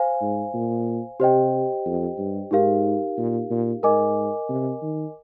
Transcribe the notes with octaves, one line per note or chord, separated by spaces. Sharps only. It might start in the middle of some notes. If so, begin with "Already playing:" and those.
Already playing: C5 F5 G#5
G#2
A#2
C3 G4 C5 D#5 G5
F2
G2
G#2 D#4 G4 A#4 F5
A#2
A#2
G#2 A#4 D#5 G#5 D6
C3
D#3